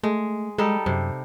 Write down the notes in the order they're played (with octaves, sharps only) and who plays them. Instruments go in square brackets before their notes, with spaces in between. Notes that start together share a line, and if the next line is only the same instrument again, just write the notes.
[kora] G#3 [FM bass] A3
[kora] G3 D#4 A4 [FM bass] G#3
[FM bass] F#2 [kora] C3